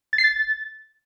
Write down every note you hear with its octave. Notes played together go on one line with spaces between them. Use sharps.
A6
C7
A6